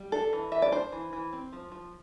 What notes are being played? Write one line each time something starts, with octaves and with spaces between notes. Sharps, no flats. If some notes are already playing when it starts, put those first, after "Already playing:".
Already playing: G3
D4 A4
E3
E3 E5
D5
D4 C5
E3
E3
C4
F3
F3